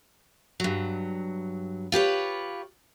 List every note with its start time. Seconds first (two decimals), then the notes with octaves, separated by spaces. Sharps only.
0.60 G2 F#3
1.92 F4 G4 B4 C#5